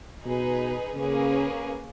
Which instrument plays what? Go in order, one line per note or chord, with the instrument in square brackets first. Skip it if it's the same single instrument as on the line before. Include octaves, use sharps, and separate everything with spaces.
[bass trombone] B2 [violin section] D#4 G#4 B4
[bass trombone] C#3 [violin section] A#3 C#4 G#4 B4